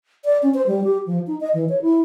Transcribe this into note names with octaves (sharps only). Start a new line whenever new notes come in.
D5
C#4
C5
G3
G4
F3
D#4
D#5
E3
C#5
E4